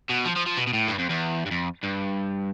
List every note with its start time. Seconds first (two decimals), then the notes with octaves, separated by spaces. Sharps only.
0.09 B2
0.25 F3
0.36 F3
0.46 F3
0.57 B2
0.67 B2
0.73 A2
0.88 G2
0.99 F2
1.10 E2
1.46 G2
1.51 F2
1.83 G2